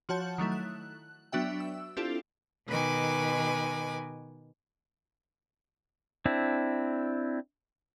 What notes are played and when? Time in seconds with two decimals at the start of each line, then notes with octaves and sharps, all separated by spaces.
0.09 F3 F#4 C#5 F#5 A5 G6
0.38 D#3 F#3 A3 E4
0.52 F#6
1.32 F#3 B3 D4 F#4 E5 G5
1.60 E6
1.97 C4 D4 E4 F4 G4 A4
2.68 B2 D#3 B4 G#5 D6
6.26 C4 D4 E4